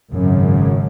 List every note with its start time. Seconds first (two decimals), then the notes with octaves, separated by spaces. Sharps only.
0.12 G#1 F#2 C#3